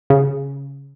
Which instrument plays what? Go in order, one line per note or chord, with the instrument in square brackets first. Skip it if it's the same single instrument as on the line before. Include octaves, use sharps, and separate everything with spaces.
[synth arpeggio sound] C#3